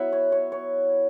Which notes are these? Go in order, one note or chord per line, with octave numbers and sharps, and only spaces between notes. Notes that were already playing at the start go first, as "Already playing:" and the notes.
Already playing: F#3 B3 E4 E5 F#5
C#5
C#5
C#5